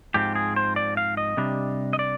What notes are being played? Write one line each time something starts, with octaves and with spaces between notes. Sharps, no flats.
G#2 F3 C4 G4
G#4
C5
D5
F5
D#5
C3 G3 D4
D#5
D5